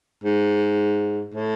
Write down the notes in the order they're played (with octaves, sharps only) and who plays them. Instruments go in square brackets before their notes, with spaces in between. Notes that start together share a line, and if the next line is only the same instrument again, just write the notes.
[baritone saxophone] G#2
A2